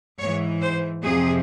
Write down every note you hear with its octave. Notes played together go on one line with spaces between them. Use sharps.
G#2 E3 C#5
C5
F2 C3 F3 G#4